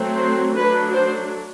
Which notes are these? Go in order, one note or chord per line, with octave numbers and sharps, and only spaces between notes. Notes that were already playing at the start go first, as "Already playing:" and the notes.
Already playing: F#3 A3 C4
C5
F#3 A3 D4 B4
C5